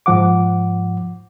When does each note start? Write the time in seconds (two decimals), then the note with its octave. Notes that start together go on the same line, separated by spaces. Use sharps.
0.06 G#2 F3 F#5 D6